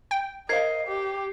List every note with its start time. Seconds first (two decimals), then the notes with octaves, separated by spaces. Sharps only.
0.11 G5
0.49 A#4 C5 D#5 F5 G#6 C7
0.87 G4